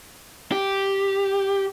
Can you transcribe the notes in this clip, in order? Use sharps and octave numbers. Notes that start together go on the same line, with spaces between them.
G4